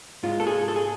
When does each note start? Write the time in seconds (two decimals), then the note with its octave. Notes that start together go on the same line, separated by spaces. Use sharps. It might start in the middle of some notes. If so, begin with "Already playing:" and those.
0.23 G#2 G#3 F4
0.40 A4
0.47 G#4
0.68 A4
0.76 G#4